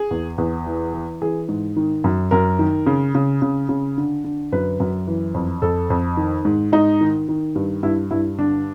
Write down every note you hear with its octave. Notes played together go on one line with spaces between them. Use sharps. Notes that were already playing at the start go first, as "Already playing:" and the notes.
Already playing: G#4
E2
E2
E3
E3
E3 G#4
G#2
D#3
F#2
F#2 A#4
D#3
C#3
C#3
C#3
C#3
D3
D3
F#2 B4
F#2
E3
F2
F2 A4
F2
D#3
G#2
G#2 D#4
D#3
D#3
G2
G2 E4
G2 E4
D3 D4